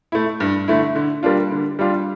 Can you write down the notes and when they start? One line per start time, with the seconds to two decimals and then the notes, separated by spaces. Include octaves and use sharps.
0.12 A3 E4
0.40 G2
0.68 D3 A3 E4
0.96 D3
1.23 G3 A#3 D4 F4
1.51 D3
1.79 G3 D4 F4